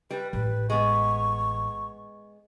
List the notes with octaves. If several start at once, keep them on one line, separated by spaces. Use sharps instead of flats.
G3 B4
A1 B4
G#3 B3 C#6